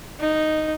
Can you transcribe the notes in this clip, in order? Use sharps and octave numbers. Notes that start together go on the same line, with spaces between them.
D#4